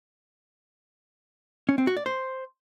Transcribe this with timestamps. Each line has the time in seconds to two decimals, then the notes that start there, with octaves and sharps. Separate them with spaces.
1.69 C#4
1.78 C4
1.87 F#4
1.97 D5
2.06 C5